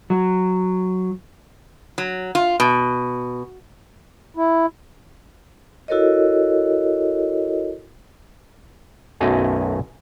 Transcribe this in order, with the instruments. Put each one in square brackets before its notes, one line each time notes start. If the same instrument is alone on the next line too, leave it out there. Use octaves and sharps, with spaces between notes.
[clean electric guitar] F#3
[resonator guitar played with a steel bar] F#3
F4
B2
[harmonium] E4
[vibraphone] E4 F#4 A4 A#4 C#5 D#5
[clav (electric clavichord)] B1 F#2 A3 D#5 G#5